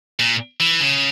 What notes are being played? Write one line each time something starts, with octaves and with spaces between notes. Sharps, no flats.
A#2
E3
C#3